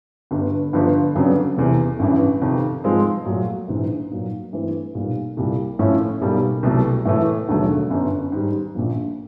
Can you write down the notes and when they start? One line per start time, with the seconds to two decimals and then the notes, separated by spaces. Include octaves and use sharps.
0.31 G1 G2 D3
0.73 G1 G2 D3 F3
1.15 F2 C#3 F#3 B3 D4
1.57 F1 E2 C3
1.99 A1 G2 E3
2.42 F2 C3 D#3
2.84 G#2 F3 G#3 C4 F4
3.25 A#2 F#3 A3
3.68 A#1 G#2 E3
4.11 A#2 F#3 A#3 D#4
4.52 G2 E3 A3 C4
4.95 B1 A#2 G3
5.37 C2 A#2 G3
5.79 A2 F3 A3 C#4 E4
6.21 B1 B2 G3 A#3
6.63 C2 B2 F#3 A3
7.05 A2 E3 A3
7.48 E1 D#2 D3 F#3 A3
7.90 G1 F#2 D3
8.32 G#2 D#3 G3
8.74 A#1 A#2 F3 A#3